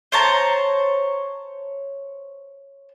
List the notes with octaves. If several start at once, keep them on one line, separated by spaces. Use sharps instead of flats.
C5 C#5 A5 A#5